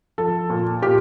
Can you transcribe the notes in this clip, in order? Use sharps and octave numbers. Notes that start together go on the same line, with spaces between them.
F3 A4
A#2
A#2 G4